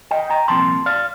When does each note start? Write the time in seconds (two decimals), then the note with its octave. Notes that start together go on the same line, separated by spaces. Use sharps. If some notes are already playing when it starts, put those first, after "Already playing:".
0.11 D#5 G5
0.30 G5 A#5
0.48 C2 A#2 F3 C4 A5 C6
0.86 D5 F5